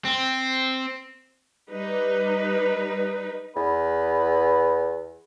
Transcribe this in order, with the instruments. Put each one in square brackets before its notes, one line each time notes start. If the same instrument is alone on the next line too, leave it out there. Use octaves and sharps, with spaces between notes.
[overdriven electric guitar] C4
[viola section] G3 D#4 B4
[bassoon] E2 [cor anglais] B4